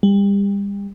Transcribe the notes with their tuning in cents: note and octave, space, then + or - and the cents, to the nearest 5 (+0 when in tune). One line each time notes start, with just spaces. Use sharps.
G3 +35